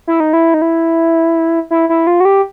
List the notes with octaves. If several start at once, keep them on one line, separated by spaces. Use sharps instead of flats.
E4
D#4
E4
D#4
E4
E4
E4
F4
F#4
G4